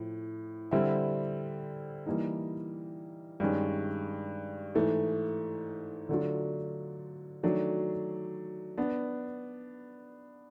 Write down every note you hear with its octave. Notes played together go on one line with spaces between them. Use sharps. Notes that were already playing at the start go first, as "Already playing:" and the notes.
Already playing: A2 F3
D3 G3 C4 E4
E3 G3 A#3 D#4
G2 D#3 G#3 C#4
G#2 E3 A3
D3 F#3 A3 D4 F4
D#3 F#3 A3 D4
B3 D4